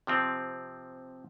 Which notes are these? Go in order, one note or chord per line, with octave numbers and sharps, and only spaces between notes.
C3 F3 C4